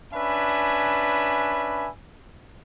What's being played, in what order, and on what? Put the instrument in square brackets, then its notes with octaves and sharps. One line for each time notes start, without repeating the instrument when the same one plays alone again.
[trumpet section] C#4 D4 B4 E5 G#5 B5